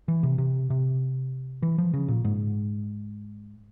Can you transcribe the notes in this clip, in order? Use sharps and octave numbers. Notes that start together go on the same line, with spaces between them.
E3
C3
C3
C3
E3
F3
C#3
A#2
G#2